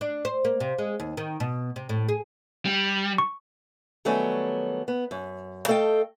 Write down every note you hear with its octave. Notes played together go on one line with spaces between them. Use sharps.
D4
C5
A#3
C3
G#3
D#2
D#3
B2
C3
A2
G#4
G3
C#6
D#3 F#3 G3 A3 B3 C#4
B3
F#2
A3 A4 D#5 F5 G5